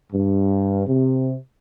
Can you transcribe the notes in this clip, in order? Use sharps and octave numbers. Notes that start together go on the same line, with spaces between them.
G2
C3